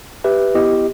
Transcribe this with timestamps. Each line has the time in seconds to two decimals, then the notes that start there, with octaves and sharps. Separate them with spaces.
0.24 G4 B4 E5
0.55 B3 E4 G4 D#5